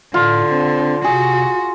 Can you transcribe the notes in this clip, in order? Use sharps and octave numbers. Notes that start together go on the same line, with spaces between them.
A2 D3 F4
C4 D4 C5
C3 F#4 G#4